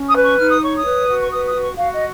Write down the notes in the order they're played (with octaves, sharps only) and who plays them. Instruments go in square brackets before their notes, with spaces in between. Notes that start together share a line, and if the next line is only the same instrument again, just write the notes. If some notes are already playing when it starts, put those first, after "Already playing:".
Already playing: [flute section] C#4
D#6
B4
C#6
D#4 F6
D#6
C#5 C#6
D#6
B4
F#4
C#6
B4 D#6
D#6
F#4
C#6
F#4 F5
D#5